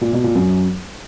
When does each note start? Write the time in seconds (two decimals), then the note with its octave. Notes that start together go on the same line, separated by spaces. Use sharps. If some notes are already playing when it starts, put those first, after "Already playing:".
0.01 A#2
0.13 B2
0.24 A#2
0.35 F#2